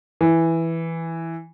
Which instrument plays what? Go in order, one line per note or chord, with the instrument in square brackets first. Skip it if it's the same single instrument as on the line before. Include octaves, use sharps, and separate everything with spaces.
[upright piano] E3